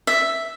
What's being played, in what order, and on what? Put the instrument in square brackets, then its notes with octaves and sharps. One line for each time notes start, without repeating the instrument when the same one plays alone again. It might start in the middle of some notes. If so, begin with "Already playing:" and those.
[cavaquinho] E5